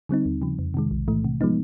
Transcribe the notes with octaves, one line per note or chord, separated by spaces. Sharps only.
D3 G3 C4 D#4
D#2
C#3 F3
F2
C3 D#3 G#3
B1
A2 E3 A3
C3
F3 G#3 B3 D#4